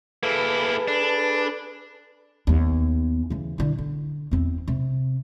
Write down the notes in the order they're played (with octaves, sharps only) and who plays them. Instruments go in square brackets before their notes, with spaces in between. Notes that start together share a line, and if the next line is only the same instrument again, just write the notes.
[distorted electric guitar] A#3 E4 [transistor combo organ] G#4 A4 B4
[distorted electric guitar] D4
[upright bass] D#2 B3
C#3 E3
D3 E4
D3
E2 C4
C3